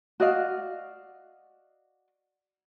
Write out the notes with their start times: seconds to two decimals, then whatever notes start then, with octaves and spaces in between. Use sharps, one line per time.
0.20 F#4 D5 D#5 F5